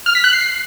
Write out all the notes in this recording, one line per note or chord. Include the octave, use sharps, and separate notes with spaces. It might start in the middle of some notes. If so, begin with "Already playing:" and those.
F6
B6
F#6
C7